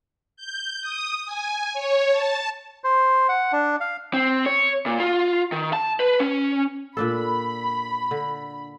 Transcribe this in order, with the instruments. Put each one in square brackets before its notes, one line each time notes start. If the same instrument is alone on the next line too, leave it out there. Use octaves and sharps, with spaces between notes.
[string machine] G6
D#6
G#5
C#5
A5
[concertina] C5
F#5
D4
F5
[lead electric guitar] C4
C#5
A#2
F4
D#3
A5
B4
C#4
[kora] A#2 D4 A4 [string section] B5
[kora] D3